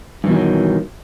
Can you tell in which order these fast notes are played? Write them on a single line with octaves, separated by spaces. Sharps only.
G2 E3 B2 D#3 F#3